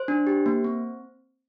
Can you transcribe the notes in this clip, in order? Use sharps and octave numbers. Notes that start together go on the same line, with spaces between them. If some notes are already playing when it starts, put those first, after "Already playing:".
Already playing: C5
D4
G4
A#3
C4